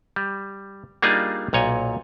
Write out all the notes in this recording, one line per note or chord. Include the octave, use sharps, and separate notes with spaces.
G3
G3 A#3 D4 D#4 F4 G#4
B1 A#2 C#5 D#5